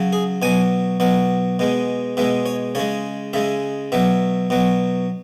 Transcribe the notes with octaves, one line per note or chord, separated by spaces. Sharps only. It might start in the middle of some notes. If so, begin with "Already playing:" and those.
Already playing: C#3 F#3
G#4
B2 F#3 G#5
B2 F#3 F#5
B2 G#3
B2 G#3 E5
C#5
C#3 G#3 C#5
C#3 G#3 E5
B2 F#3 E5
B2 F#3